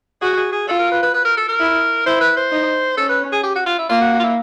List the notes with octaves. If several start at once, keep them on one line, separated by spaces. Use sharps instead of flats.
F#4 G#4
G#4
G#4
F4 A4
A#4
B4
B4
B4
A#4
A4
A#4
E4
E4 C5
B4
C5
D#4
C#4 A4
B4
G#4
G4
F#4
F4
E4
A#3 F4
F#4
F#4
F4
E4